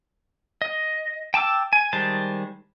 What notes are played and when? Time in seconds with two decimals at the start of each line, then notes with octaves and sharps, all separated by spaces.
0.62 D#5
1.34 G5 A5 D6 E6
1.73 G#5
1.93 D#3 G3 G#3 C5 A5